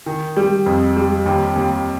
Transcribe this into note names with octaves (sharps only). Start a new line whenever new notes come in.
D#3
G3
F2
G3
D#2
D#2